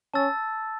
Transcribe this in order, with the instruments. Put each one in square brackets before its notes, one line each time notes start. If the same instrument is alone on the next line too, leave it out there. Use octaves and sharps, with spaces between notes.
[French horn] C#4 [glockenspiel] A5 E6 A6